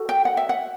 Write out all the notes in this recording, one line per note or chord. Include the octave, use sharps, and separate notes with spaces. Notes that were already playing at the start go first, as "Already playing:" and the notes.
Already playing: F#4 A4
G5
F#5
E5
F#5